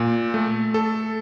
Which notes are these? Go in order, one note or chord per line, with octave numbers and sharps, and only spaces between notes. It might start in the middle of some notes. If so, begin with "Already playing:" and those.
Already playing: A#2
A3
A4